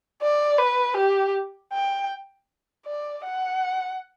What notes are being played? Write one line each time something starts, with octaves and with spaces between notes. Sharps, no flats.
D5
B4
G4
G5
D5
F#5